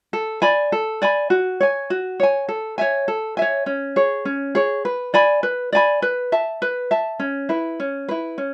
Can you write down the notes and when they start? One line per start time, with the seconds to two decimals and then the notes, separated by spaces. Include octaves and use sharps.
0.13 A4
0.42 D5 G#5 B5
0.72 A4
1.02 D5 G#5 B5
1.30 F#4
1.60 C#5 G#5
1.90 F#4
2.20 C#5 G#5
2.48 A4
2.78 C#5 E5 G#5
3.08 A4
3.37 C#5 E5 G#5
3.66 C#4
3.96 G#4 C#5
4.25 C#4
4.55 G#4 C#5
4.85 B4
5.14 D5 G#5 B5
5.43 B4
5.73 D5 G#5 B5
6.02 B4
6.32 E5 A5
6.62 B4
6.91 E5 A5
7.20 C#4
7.49 E4 B4
7.80 C#4
8.08 E4 B4
8.38 C#4